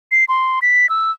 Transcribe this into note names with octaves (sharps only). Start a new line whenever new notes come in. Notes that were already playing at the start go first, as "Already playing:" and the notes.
C7
C6
B6
E6